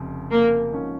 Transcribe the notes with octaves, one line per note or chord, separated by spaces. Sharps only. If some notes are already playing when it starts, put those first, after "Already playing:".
Already playing: F1 F2 C#3
A#3
G#2 F3 C#4